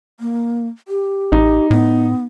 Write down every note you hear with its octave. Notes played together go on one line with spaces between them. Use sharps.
A#3
G4
A1 D#4
A2 B3